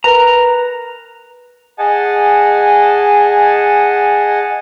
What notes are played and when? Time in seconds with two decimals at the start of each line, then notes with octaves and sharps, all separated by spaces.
0.04 A#4 B4 A#5 A#6
1.78 G#4 D#5 F#5 G#5 A5